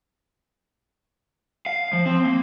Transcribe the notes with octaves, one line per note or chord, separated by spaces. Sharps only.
F5
F3
C4
A#3